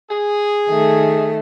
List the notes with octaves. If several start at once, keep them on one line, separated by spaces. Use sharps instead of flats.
G#4
D#3 A3